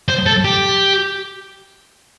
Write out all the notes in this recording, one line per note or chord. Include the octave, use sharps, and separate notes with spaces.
C5
A4
G4